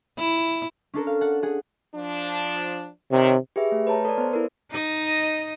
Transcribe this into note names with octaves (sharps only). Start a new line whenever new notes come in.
E4
C#4 D4 A4 A#4
F5
F#5 A5
G#4 F#5
F3 D4
C3 D#3 C#5
G4 G#4 B4 E5
A3
B4 C#5 A5 A#5
A4 D5
B3 C5
E4 A#4 B4
D#4 D#5